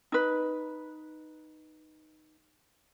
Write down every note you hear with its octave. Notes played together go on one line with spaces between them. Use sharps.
D#4 B4